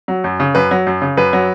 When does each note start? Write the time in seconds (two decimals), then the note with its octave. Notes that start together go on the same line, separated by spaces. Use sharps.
0.08 F#3
0.24 F#2
0.40 C#3
0.55 F#2 B4
0.71 F#3
0.87 F#2
1.02 C#3
1.17 F#2 B4
1.33 F#3